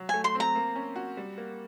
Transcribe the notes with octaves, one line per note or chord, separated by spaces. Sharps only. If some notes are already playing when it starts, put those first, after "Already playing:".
Already playing: F#3
A3 G#5
C6
C4
A#5
A#3
C#4
F#4
G3
A#3